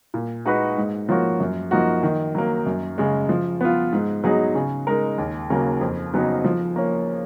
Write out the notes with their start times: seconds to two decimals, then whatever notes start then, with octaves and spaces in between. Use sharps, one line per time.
0.14 A#2
0.45 G#3 D#4 F#4 B4
0.77 G#2
1.09 F3 A#3 C#4 F#4
1.40 F#2
1.71 F3 A#3 D#4 F#4
2.03 D#3
2.35 F#3 A#3
2.66 F#2
2.98 C#3 G#3
3.29 F3
3.61 B3 F4
3.92 G#2
4.24 F#3 B3 D#4 G#4
4.55 C#3
4.87 G#3 D#4 A#4
5.18 D#2
5.50 C#3 F#3 A#3
5.81 F2
6.13 C#3 F#3 B3 D#4
6.44 F3
6.76 A#3 C#4